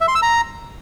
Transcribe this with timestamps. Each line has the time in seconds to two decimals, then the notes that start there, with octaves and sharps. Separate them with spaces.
0.01 E5
0.08 C6
0.15 E6
0.22 A#5